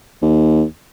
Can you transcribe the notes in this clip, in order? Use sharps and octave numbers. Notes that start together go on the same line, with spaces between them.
D#2